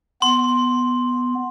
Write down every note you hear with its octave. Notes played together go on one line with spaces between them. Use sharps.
B3 C6